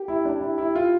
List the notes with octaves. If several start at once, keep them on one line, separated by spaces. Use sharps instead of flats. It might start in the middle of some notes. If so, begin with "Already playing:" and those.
Already playing: G4
E4
D4
E4
E4
F4